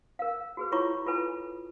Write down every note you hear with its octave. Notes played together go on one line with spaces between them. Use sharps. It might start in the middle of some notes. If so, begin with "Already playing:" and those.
A#4 F5
F#4 G#4 B4
E4 F4 C#5 C#6 D6
F4 A4 B4 G#5